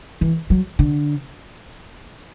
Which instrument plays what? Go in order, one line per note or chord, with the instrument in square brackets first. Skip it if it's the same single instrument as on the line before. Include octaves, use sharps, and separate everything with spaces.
[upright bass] E3
F#3
D3